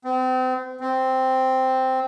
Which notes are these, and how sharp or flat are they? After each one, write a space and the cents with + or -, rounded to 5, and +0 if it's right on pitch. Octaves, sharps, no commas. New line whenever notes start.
C4 -35
C4 -5